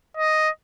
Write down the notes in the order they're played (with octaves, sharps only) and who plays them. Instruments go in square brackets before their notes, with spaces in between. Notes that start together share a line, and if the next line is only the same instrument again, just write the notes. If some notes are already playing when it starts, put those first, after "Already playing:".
[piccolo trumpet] D#5